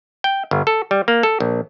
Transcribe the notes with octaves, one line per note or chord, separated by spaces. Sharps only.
G5
G1
A4
G3
A#3
A4
A#1